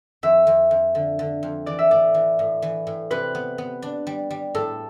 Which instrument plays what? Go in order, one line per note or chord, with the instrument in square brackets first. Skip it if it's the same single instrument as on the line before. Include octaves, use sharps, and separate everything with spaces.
[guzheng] F2 [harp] E5
[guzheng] F2
F2
D3
D3
F2
[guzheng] E3 [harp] D5
[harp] E5
[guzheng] A2 [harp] D5
[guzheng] E3
A2
E3
A2
[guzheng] C3 [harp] B4
[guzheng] B3
B3
D4
G3
G3
[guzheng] A2 [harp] A4